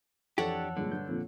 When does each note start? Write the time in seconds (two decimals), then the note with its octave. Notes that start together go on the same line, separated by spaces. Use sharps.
0.38 F2 E3 F3 D4 G4 A4 C#5 F#5
0.77 G2 A#2 D3 G#3
0.92 G2 G6
1.08 F2 A#2